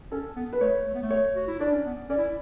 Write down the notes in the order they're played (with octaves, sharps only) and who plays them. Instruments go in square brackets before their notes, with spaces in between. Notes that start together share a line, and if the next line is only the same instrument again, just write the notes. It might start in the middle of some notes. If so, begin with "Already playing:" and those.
[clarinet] C#4 [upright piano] A4
[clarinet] B3
[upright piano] B4
[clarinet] A3 [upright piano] C#5
[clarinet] A3
B3
A3
[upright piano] C#5
[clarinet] F#4
E4
[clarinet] D4 [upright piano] D5
[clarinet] C#4
B3
[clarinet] C#4 [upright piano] D5
[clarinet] E4